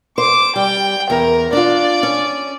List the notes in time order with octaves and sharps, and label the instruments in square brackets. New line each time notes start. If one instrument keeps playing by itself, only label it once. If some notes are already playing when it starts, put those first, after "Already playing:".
[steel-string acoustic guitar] C5 [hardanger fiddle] D6
[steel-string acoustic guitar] G3 [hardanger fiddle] G5
[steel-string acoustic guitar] E2 [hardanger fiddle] A#4
[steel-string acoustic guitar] D4 F4 [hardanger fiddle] D5
[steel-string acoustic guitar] C#4